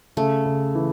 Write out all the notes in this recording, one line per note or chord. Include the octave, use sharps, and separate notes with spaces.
C#3 A3
C#3
E3